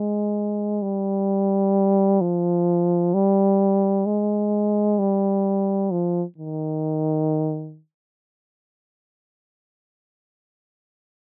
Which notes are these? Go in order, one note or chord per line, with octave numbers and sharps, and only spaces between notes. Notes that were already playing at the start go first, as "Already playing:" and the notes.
Already playing: G#3
G3
F3
G3
G#3
G3
F3
D#3